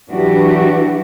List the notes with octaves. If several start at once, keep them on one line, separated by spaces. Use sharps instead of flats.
E3 F#3 D4 F#4 G4